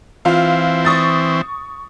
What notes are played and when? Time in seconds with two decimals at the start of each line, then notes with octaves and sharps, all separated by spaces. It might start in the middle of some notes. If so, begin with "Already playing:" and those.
0.25 E3 C4 F4 F5
0.85 C#6 D#6 A6